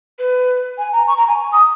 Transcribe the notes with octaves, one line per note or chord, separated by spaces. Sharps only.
B4
G#5
A#5
C#6
A#5
G#5
D#6